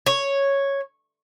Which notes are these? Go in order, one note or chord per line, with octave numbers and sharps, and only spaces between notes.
C#5